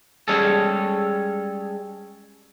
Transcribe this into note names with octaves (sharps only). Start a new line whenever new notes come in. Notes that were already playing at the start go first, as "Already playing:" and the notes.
G3 G#3 C#4 G#4 A4